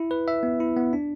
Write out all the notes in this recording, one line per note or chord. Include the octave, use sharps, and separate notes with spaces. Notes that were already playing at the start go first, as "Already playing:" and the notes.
Already playing: E4
B4
E5
B3
E4
B3
D4